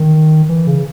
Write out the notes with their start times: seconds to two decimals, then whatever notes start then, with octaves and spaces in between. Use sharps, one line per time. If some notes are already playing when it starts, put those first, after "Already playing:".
Already playing: D#3
0.49 E3
0.67 C#3